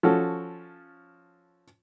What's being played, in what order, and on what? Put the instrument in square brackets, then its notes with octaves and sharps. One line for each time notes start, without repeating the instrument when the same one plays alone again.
[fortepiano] F3 C#4 F#4 A4